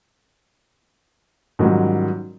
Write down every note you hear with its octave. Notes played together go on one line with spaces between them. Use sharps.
G#2 D#3 F#3 G3 C#4 F4